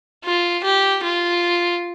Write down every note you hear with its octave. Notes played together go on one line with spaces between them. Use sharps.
F4
G4
F4